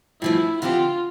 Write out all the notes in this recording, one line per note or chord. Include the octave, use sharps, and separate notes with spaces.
G2 F3 A3 E4
D3 F3 C4 F4 G4